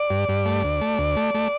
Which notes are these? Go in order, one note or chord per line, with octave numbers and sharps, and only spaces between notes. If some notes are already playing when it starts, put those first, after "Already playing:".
Already playing: D5
G2
G2
A3
D2
A3
D2
A3
A3